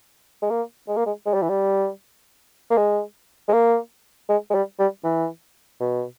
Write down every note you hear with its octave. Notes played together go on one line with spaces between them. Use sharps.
G#3
A#3
G#3
A#3
G#3
G#3
G3
E3
G3
A#3
G#3
G#3
A#3
G#3
G#3
G3
G3
E3
B2